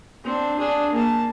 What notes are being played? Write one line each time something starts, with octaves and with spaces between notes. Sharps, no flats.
C4 D4
D4 G#4
A#3 A5